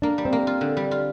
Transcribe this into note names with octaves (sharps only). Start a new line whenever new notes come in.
A#3 D4
G3
C4
A#3
F4
D3
G3
F4